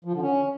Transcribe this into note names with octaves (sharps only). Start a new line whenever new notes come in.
F3
D3
C#4